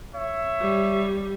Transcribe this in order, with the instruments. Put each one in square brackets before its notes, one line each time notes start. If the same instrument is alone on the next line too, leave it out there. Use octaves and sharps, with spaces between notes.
[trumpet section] C#5 E5
[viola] G3